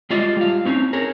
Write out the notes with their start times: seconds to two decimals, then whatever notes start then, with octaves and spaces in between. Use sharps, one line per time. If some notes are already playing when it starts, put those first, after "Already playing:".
0.10 G3 G#3 F4 D5 D#5
0.37 G3 F4 F5
0.65 C4 C#4 D#4
0.93 G#4 A#4 C#5